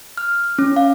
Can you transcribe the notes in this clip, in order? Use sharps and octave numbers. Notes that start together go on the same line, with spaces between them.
F6
C#4
F5